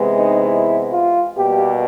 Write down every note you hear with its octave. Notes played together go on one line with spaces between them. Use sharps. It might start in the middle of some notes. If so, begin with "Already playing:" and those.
Already playing: C3 E3 G#3 B3
D#4
E4
F4
B2 G3 A#3 G4